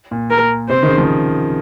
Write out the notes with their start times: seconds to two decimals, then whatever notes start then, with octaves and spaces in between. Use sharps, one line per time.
0.11 A#2
0.30 A#4
0.69 C3 C5
0.83 D#3
0.88 C#3
0.98 F3